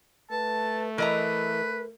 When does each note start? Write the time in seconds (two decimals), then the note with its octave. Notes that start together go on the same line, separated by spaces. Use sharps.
0.31 A3 B4 A5
0.98 E3 A#4 B4 D#5 A#5